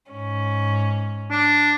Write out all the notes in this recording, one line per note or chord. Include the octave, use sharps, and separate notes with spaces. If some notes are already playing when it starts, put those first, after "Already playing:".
G#2 C#4
D4